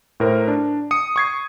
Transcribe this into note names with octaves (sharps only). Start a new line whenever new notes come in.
A2 A#4 C5
D4
D#6 C#7
C#6 G#6 C7